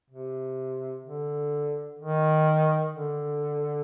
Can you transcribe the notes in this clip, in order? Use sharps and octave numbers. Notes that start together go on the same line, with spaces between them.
C3
D3
D#3
D3